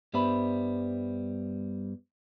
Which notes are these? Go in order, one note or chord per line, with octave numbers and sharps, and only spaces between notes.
G2 G3 B3 C5 E5 B5